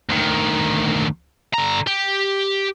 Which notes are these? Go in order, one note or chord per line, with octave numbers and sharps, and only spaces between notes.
D2 D#3
D3 A#5
G4